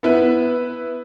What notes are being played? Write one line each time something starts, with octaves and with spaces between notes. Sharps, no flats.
B3 E4 B4